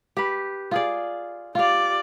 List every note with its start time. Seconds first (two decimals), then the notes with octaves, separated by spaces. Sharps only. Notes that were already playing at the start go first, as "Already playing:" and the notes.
0.17 G4 B4
0.71 F4 G#4 D5
1.55 F4 G4 D5 F5